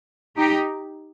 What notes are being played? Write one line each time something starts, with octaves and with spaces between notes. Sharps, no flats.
D#4 G4